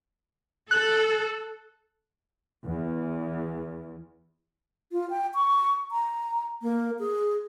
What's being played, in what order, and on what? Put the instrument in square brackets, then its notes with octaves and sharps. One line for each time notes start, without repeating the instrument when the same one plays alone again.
[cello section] A4 [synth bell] F#6 F#7
[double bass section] E2
[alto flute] F4
G5
C#6
A#5
A#3
G#4